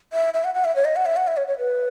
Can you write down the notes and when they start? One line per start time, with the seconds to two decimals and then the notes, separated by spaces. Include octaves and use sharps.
0.13 E5
0.34 E5
0.44 F#5
0.54 F#5
0.65 E5
0.76 C#5
0.85 D#5
0.96 F#5
1.06 E5
1.17 F#5
1.27 E5
1.37 C#5
1.48 C#5
1.58 B4